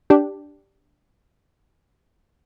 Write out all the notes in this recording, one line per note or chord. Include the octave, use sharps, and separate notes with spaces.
D4 G4